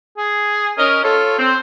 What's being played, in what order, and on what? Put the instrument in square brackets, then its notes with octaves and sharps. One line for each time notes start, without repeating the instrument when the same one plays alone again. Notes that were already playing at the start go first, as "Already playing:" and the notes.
[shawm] G#4
[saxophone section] C#4 D#5 [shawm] A#4
[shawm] F4 [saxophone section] A4 C#5
[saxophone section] C4 [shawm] C5